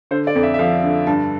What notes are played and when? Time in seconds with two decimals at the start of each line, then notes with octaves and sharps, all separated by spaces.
0.11 D3 C5
0.27 D5
0.35 F2
0.43 E5
0.54 E5
0.59 F3 F5
0.83 D3
1.07 G2 A5